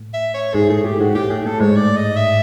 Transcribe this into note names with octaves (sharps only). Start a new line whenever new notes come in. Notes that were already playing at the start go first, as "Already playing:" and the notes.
Already playing: A2
E5
C#5
G#2 G#4
A2 G#4
A2 G4
G#2 F#4
A2 G4
A2 G#4
A2 A4
G#2 C#5
D5
D#5
E5